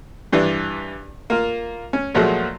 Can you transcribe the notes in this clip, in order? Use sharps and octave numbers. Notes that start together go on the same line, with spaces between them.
G2 E3 D4
A#3 F4
C#4
A#2 F3 F#3 G#3 A3 F#4